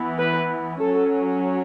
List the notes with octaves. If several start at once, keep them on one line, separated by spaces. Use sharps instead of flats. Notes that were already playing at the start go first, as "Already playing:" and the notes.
Already playing: E3 B3
B4
F#3 C#4 A4